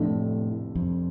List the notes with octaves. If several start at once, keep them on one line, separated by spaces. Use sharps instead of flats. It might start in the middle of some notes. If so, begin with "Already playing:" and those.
Already playing: F1 F2 A2 D3
F2